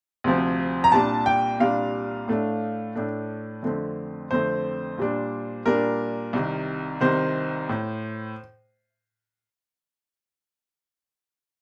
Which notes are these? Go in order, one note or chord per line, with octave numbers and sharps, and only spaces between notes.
D2 C3 F3 C4
A#5
C2 A#2 G3 D4 A5
G5
C2 A#2 G3 D4 F5
A2 A3 D4
A2 A3 D4
F2 D3 A3 C4
F2 D3 A3 C4 C5
A#2 G3 D4
A#2 G3 D4 A#4
C2 C3 D#3
C2 C3 D#3 C5
A2